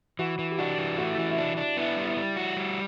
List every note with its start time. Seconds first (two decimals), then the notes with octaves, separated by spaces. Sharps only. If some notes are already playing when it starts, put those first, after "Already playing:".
0.19 E3 F#4
0.39 E3
0.51 G4
0.59 D4 F#4
0.78 E3
0.98 A3 F#4
1.08 E4
1.18 E3
1.29 E4
1.38 D4
1.57 D4
1.77 B3 E4
1.97 G3
2.05 E4
2.17 G3
2.36 F#4
2.57 G3